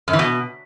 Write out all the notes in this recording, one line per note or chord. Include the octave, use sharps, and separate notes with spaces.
F#2
E3
B2